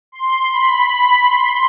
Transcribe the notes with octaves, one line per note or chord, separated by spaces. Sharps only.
C6
B5
B5
C6